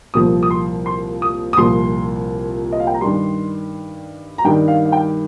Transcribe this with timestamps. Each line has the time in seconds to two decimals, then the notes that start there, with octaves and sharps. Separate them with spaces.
0.14 C2 A#2 F3 D#6
0.43 D#6
0.51 C6
0.86 C6
1.22 D#6
1.53 D#6
1.57 C2 A#2 F3 C6
2.72 D#5
2.80 F5
2.87 G5
2.94 A#5
3.01 G2 D#3 G3 C6
4.38 A#5
4.45 G2 D#3 G3 G5
4.68 F5
4.86 F5
4.92 G5